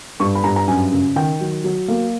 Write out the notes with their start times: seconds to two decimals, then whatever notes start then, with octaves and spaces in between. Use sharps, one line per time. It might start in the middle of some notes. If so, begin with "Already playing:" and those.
0.20 G2 C#6
0.35 B5
0.44 G2 A#5
0.56 A#5
0.67 F#2 G#5
0.92 C#3
1.16 D#3 G5
1.41 F#3
1.64 F#3
1.88 A#3